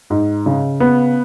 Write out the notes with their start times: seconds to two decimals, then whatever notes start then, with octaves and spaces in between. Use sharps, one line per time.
0.10 G#2
0.46 C#3
0.80 B3